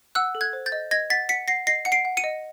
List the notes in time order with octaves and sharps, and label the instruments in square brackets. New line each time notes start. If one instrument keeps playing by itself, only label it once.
[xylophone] F#5 E6 F#6
A4
F#6 G#6
C5
G6 A6
D#5
D#5 G#6 A#6
F#5 A6 B6
F#5 B6 C#7
F#5 A#6 C7
D#5 A#6 C7
F#5 C#7
C7 D7
F#5
C#7 D#7
D#5